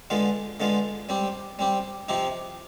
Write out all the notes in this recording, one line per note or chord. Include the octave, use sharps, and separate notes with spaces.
D3 G#3 B3 F4
D3 G#3 B3 F4
G3 C4 G4
G3 C4 G4
C3 F3 C4 D#4 G4